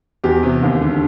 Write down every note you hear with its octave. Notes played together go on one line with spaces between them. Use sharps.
E2 G4
C3
D#2
D3